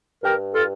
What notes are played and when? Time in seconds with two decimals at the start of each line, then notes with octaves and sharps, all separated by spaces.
0.22 G2 G4 A#4
0.53 F4 A4